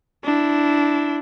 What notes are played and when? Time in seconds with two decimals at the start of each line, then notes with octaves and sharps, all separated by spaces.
0.24 D4 E4